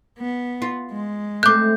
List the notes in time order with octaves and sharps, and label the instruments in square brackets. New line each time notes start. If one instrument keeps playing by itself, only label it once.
[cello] B3
[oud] F4
[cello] G#3
[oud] A3 C4 [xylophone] D6 F#6 [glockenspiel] G6